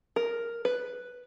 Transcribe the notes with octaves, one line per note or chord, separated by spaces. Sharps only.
A#4
B4